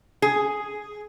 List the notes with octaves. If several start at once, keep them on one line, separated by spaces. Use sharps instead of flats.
G#4